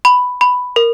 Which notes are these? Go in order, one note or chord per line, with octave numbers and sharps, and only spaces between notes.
B5
B5
A#4